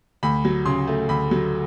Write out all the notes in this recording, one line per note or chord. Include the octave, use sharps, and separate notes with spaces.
D2 B5
F#3
C#3 C6
A3
D2 B5
F#3